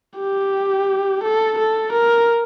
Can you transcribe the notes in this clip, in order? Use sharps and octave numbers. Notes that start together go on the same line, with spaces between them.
G4
A4
A4
A#4